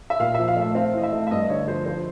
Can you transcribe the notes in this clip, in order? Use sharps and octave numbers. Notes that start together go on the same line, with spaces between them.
E5
A#2 F5
F3 E5
F5
A3
E5
C4 F5
E3 D#5
E5
A3
E5
G2 D#5
D3 C#5
F3 C5
F3 C5